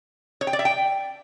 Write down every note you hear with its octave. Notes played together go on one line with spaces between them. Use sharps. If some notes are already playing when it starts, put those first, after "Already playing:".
C#5
G5
D5
E5
G5